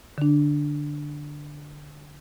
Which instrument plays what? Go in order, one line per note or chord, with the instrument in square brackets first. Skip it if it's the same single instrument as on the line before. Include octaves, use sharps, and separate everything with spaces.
[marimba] D3 D4